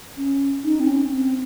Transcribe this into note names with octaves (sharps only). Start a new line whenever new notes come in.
C#4
D#4
C4
C#4
C4